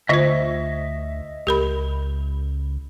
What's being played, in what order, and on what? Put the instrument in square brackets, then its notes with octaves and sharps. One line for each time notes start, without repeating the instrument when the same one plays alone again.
[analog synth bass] D2 [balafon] D3 F4 C5 [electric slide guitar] D#5 E5
[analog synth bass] C#2 [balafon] G4 A#4 B5